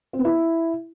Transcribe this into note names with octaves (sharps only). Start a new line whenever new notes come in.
C4
B3
E4